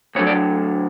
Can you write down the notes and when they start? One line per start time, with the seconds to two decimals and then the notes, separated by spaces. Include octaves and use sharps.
0.15 D2 D3 F#3 C#5
0.27 D5